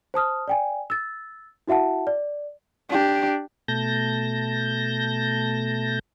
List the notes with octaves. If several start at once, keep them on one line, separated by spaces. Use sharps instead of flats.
C5 A5 D#6 F6
D5 G5 G#5
E6 A6
E4 F#4 E5 F#5 A5
D5
D4 G4
B2 A3 A5 G6 A#6